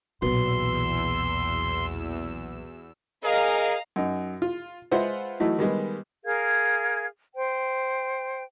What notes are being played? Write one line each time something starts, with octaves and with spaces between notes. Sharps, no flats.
B1 E2 A#2 F#3 B3 C6 E6
G#4 A#4 D#5 F5 A#5
F#2 D#4
F4
G#3 F4 B4 C5 E5 F#5
E3 F#3 A3 D#4 E4
D#3 G3 G#3 B3
G#4 A#4 F5 G#6
C5 G5